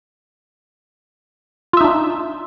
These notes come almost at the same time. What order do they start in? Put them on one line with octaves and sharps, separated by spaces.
F4 E5 D#4 D4